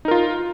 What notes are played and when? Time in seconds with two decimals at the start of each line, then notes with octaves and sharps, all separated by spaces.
0.05 D#4
0.08 A#4
0.11 F4